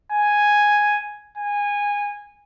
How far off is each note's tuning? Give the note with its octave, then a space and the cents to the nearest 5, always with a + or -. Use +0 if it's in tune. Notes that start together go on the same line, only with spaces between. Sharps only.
G#5 +0
G#5 -20